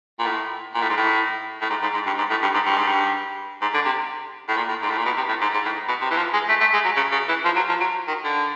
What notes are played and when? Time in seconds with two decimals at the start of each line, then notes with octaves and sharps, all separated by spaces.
0.19 A#2
0.26 A2
0.75 A#2
0.82 A2
0.89 G#2
0.97 A2
1.61 A2
1.70 G#2
1.82 G#2
1.94 G#2
2.06 G2
2.18 G#2
2.30 A2
2.42 G2
2.54 G#2
2.66 G2
2.77 G#2
2.87 G2
3.62 G#2
3.74 D3
3.85 C3
4.48 A2
4.57 A#2
4.69 A2
4.83 G#2
4.90 A2
4.98 A#2
5.05 B2
5.17 C3
5.28 A2
5.41 G#2
5.54 G#2
5.65 A2
5.89 B2
6.01 C3
6.11 E3
6.17 F3
6.33 G#3
6.49 A3
6.60 A3
6.73 G#3
6.85 F#3
6.96 C#3
7.12 C#3
7.28 E3
7.45 F3
7.56 F#3
7.69 F3
7.80 F#3
8.08 D#3
8.24 D3